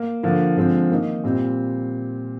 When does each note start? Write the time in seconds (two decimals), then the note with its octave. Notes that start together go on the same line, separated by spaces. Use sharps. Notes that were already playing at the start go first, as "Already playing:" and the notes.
Already playing: A#3
0.23 D3 F3 A#3
0.57 D3 F3 G#3 C4
0.91 D#3 A#3 D#4
1.24 A#2 G3 C4